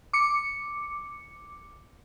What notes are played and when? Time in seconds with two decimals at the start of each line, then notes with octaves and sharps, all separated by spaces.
0.13 D6 C#7